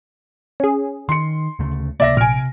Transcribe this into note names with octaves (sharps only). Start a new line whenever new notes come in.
C#4 G#4
D#3 C6 C#7
D2 C#3 A3
C#2 C3 A#3 D5 E5 A#6
A#1 C3 G#5 F6 D7